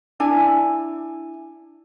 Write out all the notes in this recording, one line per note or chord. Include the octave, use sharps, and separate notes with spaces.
D4 E4 G#5